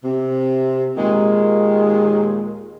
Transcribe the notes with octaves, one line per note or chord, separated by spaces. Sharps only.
C3
D#2 A#2 D#3 G#3